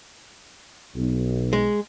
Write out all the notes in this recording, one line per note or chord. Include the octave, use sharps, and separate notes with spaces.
B1
G#3